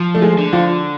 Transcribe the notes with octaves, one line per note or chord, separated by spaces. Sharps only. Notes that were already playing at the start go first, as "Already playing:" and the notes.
Already playing: F3
A3
G#3
D3
F3